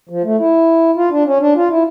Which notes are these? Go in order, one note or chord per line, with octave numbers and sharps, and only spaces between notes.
F3
A3
E4
F4
D4
C#4
D4
F4
E4